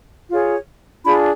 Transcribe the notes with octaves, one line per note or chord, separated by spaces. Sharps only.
F4 G#4 C#5
D4 F4 G#4 B5